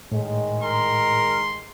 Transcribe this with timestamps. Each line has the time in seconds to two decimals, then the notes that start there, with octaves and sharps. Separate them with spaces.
0.12 A2 D#3 G#3
0.63 A#4 C6